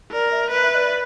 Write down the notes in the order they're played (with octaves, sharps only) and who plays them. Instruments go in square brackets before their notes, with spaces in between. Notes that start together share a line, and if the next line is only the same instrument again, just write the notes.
[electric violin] A#4 [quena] D5
[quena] E5
[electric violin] B4 [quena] E5
[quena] E5
D5